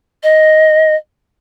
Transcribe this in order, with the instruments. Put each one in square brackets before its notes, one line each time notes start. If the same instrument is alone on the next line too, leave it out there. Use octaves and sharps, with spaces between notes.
[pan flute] D#5